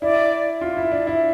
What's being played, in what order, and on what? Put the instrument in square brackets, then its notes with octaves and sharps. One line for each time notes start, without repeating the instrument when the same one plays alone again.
[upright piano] E4 [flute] D5
[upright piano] F4
E4
D4
E4